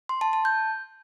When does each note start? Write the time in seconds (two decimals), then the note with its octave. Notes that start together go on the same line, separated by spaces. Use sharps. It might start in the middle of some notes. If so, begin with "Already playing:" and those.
0.09 C6
0.21 A5
0.33 A5
0.45 G6